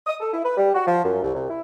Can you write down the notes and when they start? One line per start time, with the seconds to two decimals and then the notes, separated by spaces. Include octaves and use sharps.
0.06 D#6
0.20 A4
0.33 E4
0.44 B4
0.57 G3
0.75 F#4
0.87 F3
1.04 F#2
1.22 C2
1.34 C2
1.50 E4